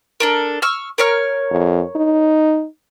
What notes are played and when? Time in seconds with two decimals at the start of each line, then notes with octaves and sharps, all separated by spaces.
0.20 D4 A4 A#4
0.62 C#6 E6 F6
0.98 A#4 C#5 F6
1.51 F2
1.96 D#4